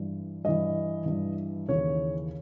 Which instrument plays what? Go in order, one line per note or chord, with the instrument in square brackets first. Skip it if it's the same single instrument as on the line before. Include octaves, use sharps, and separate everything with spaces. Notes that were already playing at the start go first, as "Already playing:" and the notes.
Already playing: [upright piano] G2 E3
G2 E3 D#5
G2 E3
D#2 C#3 E3 C#5